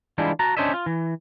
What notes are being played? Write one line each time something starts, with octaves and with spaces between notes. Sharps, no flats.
E3 G3 G#3 D4 E4 F4
F#4 F#5 A5 A#5
C#4 D4 C5 C#5 D#5 E5
F4
E3